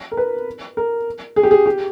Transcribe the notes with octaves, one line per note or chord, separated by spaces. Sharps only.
A#4
B4
A#4
G#4
G4
G#4
G4